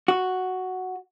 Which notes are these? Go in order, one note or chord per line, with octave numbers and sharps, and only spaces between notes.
F#4